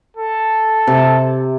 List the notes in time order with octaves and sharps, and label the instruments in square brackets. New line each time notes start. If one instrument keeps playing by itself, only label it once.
[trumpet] A4
[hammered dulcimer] C3